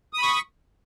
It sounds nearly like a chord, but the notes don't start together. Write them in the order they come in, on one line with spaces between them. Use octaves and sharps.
D#6 B5 C#6